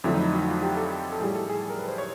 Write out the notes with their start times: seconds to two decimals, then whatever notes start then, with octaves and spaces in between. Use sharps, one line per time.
0.04 F2 D3 F#3 A3 E4
0.14 D#4
0.24 E4
0.33 F#4
0.48 F4
0.63 G4
0.77 A4
1.12 A4
1.20 A2 E3 G3 G#4
1.35 A4
1.50 G#4
1.69 A#4
1.79 B4
1.88 C5
1.98 C#5